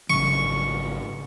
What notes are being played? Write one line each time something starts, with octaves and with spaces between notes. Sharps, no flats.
G#1 C#3 F#3 C#6